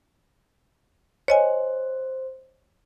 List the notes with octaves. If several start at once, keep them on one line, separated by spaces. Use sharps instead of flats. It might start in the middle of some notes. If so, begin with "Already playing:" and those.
C5 C#5 D#5 G#5